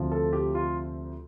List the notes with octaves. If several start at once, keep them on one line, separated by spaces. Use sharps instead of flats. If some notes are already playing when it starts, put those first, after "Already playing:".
Already playing: D2 C3 F3
A4
G4
F4